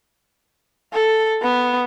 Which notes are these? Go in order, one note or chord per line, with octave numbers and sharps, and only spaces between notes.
A4
B3